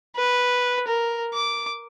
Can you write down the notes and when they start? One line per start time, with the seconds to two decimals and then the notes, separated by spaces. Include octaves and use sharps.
0.16 B4
0.88 A#4
1.34 D6